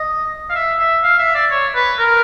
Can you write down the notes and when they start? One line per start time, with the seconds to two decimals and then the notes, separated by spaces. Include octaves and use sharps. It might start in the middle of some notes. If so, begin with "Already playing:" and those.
Already playing: D#5
0.50 F5
0.55 E5
0.79 E5
1.03 F5
1.19 E5
1.35 D5
1.51 C#5
1.75 B4
1.99 A#4